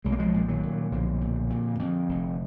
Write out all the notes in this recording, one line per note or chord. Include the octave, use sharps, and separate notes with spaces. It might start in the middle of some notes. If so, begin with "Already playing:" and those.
B1 G#3
A#3
F3 G#3
A#2
D#3 F#3
A#2
B1 D3 F3
A#2
A#2
F2
F1